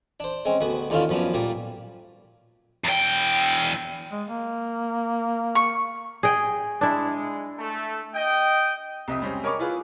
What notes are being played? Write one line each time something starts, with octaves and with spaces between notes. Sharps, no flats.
D4 C5
G#3 C4 C#4
D2 B3 F#4
D#2 D3 C#4 E4 F4 F5
F#2 F3 B3 C#4 D4
A#2 G3 A#3
E2 G5
G#3
A#3
C#6
G#4 D#5 G5
G#3 D4 E4
A3 A4
D#5 G5
C2 F2 D#5 E5 D#6
G3 G#3 C4 C#4 G4
A#4 C#5 D#5 B5 C#6 D6
E4 F4 G#4 B4